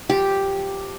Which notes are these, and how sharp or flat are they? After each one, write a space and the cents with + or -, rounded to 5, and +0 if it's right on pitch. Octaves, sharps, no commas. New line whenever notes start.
F3 +10 G4 +0